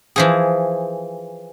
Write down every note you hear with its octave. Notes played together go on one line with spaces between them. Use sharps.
E3 F3 G#4